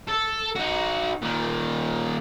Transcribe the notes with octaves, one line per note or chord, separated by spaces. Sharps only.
A4
D#4 F#4
A#2 D#3